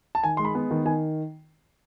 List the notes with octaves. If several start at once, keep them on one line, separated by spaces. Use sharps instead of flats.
A5
D#3 G#5
G#3 C6
B5
B3
D#3
D#3 G#5